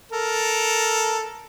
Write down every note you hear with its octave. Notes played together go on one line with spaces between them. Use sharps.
A4 A#4